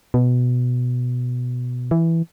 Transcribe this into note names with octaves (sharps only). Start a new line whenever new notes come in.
B2
E3